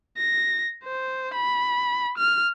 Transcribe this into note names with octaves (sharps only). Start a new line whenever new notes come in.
A#6
C5
B5
F6